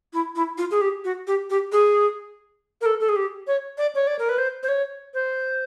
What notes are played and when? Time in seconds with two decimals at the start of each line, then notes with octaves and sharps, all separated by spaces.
0.13 E4
0.36 E4
0.58 F4
0.71 G#4
0.81 G4
1.05 F#4
1.27 G4
1.50 G4
1.72 G#4
2.81 A#4
2.86 A4
3.00 A4
3.09 G#4
3.16 G4
3.47 C#5
3.78 D5
3.95 C#5
4.07 D5
4.19 A#4
4.29 B4
4.38 C5
4.63 C5
4.68 C#5
5.14 C5